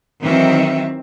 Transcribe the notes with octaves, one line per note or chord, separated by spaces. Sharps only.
D#3 E3 F#3 C4 E5